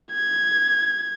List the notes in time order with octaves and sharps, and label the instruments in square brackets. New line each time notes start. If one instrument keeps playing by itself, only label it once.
[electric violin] G#6